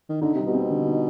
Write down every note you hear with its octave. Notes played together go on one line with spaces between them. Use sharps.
D#3
D3 D#4
C3 G3
B2
C4
D3
D#4